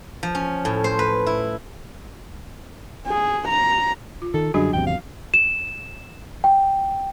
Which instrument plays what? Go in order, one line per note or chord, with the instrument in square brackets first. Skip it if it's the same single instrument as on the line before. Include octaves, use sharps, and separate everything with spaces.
[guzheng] F3
C#4
A2
C5
B4
E4
[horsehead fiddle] G#4
A#5
[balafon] F4
[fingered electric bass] D#3 [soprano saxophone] A4
[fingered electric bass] F#2 D3 G3 [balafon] F#3 D4 F#4 [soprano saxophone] G#4
[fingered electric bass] G#1 E2 C3 [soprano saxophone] G5
[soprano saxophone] F5
[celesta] E7
G5